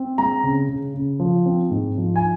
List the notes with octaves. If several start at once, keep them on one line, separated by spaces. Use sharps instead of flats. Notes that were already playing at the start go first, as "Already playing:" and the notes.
Already playing: C4
G#3 A#5
C#3
C#3
C#3
F3
C4
G#2
F3
G#5